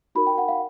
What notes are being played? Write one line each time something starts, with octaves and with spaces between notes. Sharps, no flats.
D#4 F#4 A#4 B5
G5
F#5
F5